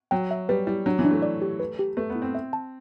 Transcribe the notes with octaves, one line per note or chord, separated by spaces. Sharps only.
F#3 G5
E5
G3 B4
G3 E4
F#3 D4
E3
D4
A3
D5
G4
B4
G4
A3 B4
B3
E4
C4
E5
A5